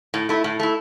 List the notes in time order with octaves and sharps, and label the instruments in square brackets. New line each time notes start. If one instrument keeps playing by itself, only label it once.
[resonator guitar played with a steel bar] A2
A3 E4
A2
A3 E4